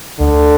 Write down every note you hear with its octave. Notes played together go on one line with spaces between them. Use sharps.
D2 D3